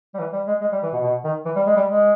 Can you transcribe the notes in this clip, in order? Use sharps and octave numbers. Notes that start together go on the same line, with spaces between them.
G3
E3
G3
G#3
G#3
G3
E3
B2
B2
D#3
E3
G3
G#3
G3
G#3